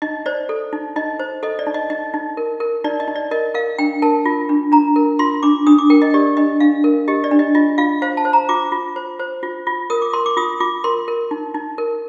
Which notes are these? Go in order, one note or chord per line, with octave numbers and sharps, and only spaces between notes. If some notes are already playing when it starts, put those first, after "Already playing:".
D#4 D#5
C5 D5
A4
D#4
D#4 D#5
C5
A4 D#5
D5
D#4
D#5
D#4 D#5
D#4
A#4
A#4
D#4 D5
D#5
D#4
D5
A#4 D#5
A#4 F5
D4 G5
A#4 A5
F4
D4
D4 A#5
A#4
F4 C6
D4 D6
D4 D#6
D6
A#4 G5
D#5
G4 D5
D4 D#5
D4 F5
A#4
G4 D#5
D5
D4
D#5
F4 D#5
F4 F5
C5 F5
A5
C5
A#5
F4 D6
F4
C5
C5
F4
F4
A#4 D#6
D6
A#4 C6
D6
F4 D#6
F4 D6
A#4 C6
A#4
D#4
D#4
A#4